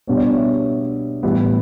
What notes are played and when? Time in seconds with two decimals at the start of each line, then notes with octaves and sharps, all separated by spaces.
0.07 B2 G3 B3 D4 C#5
0.17 D5
0.25 C#5
0.36 E5
1.23 A2 E3 G3 B3